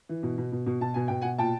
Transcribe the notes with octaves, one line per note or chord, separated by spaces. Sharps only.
E3
B2
B2
B2
B2
B2 A5
B2 G#5
B2 G5
B2 F#5 G#5
A#2 G5 A5